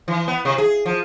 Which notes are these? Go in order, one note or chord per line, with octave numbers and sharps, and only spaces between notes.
E3
B3
C3
G#4
F3